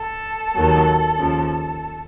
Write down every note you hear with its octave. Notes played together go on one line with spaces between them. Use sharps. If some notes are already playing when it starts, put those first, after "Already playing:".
Already playing: A4
D#2 D#3 F#3
D#2 C#3 F3